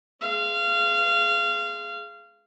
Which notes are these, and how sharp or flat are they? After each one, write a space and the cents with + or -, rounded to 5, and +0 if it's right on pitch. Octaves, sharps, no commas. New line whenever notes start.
G#3 +5 F5 -25